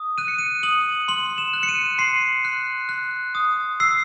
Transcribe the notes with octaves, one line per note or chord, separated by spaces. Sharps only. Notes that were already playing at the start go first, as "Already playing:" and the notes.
Already playing: D#6
F#6 D#7
C#7
D#7
D#6 F#7
C6 F#7
E7
F#6
C#7
D#7
C6 C7
F#6
F#6
D#6
E6 C7